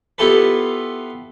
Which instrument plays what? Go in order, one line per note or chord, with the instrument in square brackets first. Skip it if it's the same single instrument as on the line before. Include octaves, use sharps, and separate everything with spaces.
[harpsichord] B3 E4 F4 G4 A4 B4